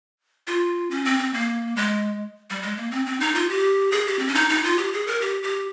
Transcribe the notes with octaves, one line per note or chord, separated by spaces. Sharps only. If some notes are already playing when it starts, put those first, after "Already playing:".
F4
C#4
C4
C4
A#3
G#3
G3
G#3
A#3
C4
C4
D#4
F4
G4
G#4
G4
C4
C#4
D#4
D#4
F4
G4
G#4
A#4
G4
G4